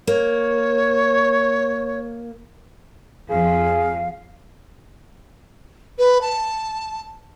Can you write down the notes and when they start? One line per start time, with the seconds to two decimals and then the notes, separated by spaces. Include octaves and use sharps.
0.07 A#3 C#5
3.30 F2 G#4 F5
5.98 B4
6.21 A5